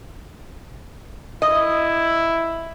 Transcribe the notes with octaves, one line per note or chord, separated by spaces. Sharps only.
E4 D#5